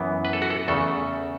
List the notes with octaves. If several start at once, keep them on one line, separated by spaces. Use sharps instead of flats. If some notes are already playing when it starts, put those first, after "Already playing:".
Already playing: F#2 E3 B3
B4
A4
F#4
A4
E2 C#3 A3 A4